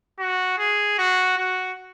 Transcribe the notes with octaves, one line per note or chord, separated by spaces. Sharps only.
F#4
G#4
F#4
F#4